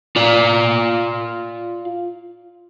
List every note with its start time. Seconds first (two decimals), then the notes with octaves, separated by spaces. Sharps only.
0.16 F4 D5